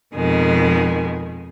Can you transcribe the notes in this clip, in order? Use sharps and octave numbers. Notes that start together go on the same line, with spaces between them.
F2 B2 D#3 G#3